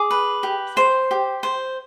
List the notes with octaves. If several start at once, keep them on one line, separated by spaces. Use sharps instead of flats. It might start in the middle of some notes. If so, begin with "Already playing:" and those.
Already playing: G#4 D6
B4
G4
C5
G4
C5